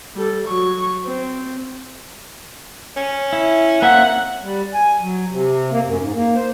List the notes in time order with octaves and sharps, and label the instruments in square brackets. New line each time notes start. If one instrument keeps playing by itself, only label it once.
[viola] G3 A4
F#3 C#6
C4
[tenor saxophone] C#4
[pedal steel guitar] E4
[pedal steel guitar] A#3 C4 E5 [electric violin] F#5
[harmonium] G3
G#5
F#3
C3
A#3
F#2
G#2
A#3
C5